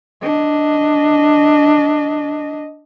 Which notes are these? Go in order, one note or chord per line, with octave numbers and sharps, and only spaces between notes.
D4 D#5